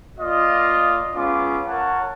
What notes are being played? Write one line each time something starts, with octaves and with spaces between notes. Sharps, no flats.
A#3 F4 D5 D#5
G#3 B3 C#4 F4 D6
A#4 C#5 F#5 A5